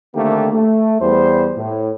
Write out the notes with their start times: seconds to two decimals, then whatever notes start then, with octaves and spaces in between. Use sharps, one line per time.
0.15 D3 D#3 A3 A#3 C4 G4
0.53 A3
1.00 E2 G3 C5
1.57 A2